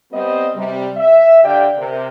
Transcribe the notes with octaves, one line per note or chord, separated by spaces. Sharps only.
G3 B3 C4 G4 C5 D#5
C3 G3
E5
D3 G4 D5 F5 G5
C3 A#4